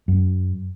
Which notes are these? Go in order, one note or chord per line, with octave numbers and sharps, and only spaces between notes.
F#2